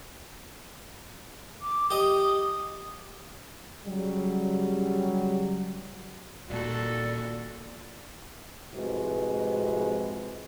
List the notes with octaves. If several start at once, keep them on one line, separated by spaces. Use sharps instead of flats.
D6
G4 D#5 D#6
C#3 F#3 G3
D#1 A#2 F#4 A4 D5
F2 A2 C3 G#3 F#4 B4